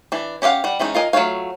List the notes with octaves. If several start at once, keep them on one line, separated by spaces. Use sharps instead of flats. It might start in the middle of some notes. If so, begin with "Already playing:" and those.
E3 D4
C#4 G4 D#5 F5 F#5
G3 F#5
E3 G#3 C#4 D#4
F4 A#4 D#5 G#5
F#3 A3 F4 C#5 F5